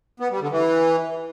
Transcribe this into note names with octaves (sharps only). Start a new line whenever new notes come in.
B3
G3
D3
E3